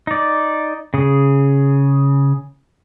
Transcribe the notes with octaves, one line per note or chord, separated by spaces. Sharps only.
D#4 D5
C#3 G#4